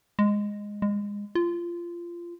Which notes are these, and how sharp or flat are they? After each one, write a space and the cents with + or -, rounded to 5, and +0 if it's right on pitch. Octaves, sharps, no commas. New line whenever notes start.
G#3 -10
G#3 -25
F4 -20